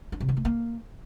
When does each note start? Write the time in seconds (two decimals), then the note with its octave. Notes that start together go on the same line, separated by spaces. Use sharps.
0.12 D4
0.20 C3
0.29 D#3
0.37 A3
0.45 A#3